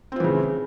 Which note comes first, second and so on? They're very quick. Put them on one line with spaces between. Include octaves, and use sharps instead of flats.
C4 F4 E3 C#3